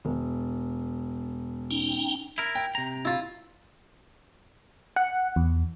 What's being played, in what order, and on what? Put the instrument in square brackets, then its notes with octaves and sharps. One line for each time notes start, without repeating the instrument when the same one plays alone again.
[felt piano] E1
[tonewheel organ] C#4 D#4 G5
[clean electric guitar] E4 A#4
[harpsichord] G5
[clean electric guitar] C3 A#5
[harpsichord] E4 F4
[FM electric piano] F#5
E2